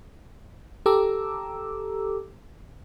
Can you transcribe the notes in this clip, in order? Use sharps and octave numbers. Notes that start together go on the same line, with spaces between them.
G4 A4 A#5 D6 E6